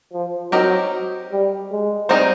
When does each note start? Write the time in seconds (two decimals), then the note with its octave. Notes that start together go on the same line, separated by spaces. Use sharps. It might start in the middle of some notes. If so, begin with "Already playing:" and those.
0.13 F3
0.52 F#3 C4 D#4 G4 A#4
1.31 G3
1.71 G#3
2.09 G3 C4 D#4 G#4 C5